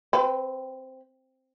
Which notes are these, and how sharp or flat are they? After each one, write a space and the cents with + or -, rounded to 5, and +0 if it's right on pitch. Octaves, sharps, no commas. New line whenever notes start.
C4 +0 B4 +30